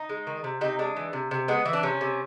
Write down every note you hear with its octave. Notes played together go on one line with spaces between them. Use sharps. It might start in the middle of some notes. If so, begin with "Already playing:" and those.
Already playing: D#4
G#3
D#3
C3
C3 D#4
G#3 D4
E3
C3
C3
G#3 B3
E3
D4
C3 C#4
C3